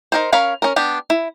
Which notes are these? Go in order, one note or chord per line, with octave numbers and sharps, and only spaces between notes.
D#4 A#4 C5
C#4 A#4 C#5 F5 B5
C#4 A#4
B3 D4 G4
E4